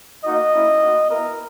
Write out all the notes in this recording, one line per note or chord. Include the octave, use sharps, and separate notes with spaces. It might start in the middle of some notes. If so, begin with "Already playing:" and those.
A#3 D#4 F#4 D#5
A#3 C#4 E4
A#3 D#4 F#4
B3 E4 A#4